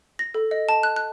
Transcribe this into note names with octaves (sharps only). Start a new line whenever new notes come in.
A#6
A4
D#5
A5
F#6
F#6